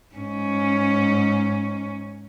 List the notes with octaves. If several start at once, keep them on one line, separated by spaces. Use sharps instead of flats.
G#2 C#4